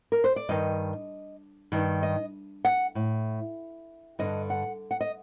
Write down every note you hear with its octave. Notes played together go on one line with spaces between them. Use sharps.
A#4
C5
D5
G2 D#3 D#5
G2 D#3
D#5
F#5
A2
G2 D3 D#5
F#5
F#5
D#5